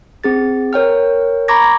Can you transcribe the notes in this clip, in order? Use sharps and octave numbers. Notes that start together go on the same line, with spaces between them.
C4 G#4 A6
A#4 C#5 G5 F6
A#5 B5 C#6 D6 G#6 A#6